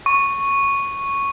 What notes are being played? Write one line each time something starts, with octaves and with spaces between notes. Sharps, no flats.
C#6